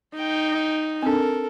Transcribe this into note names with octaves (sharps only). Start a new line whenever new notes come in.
D#4 G5
C4 D4 A4 A#4